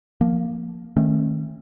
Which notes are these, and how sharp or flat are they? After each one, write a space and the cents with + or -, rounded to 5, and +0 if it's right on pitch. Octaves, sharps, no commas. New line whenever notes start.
F3 +0 A#3 +0
D#3 +0 A3 +0 C#4 -35